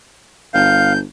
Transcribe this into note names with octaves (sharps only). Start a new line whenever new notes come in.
G1 F5 G6